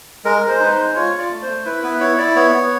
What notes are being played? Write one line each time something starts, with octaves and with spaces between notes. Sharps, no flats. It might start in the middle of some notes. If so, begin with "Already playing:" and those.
G#3 A#4
G#3
C5
D#4 B4
C5
G#3
F4 C#5
F4
D5
A3
C5
A3
E4 B4
B3 B4
E4 C#5
E4 D5
B3 C#5
B3